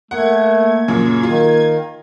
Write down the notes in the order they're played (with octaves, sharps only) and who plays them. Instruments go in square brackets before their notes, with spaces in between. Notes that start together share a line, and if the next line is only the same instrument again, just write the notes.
[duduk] A3 [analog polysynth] A#3 G#6 [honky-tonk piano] F#5
[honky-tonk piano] F#2 A#2 C#3
[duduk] D#3 [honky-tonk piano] F4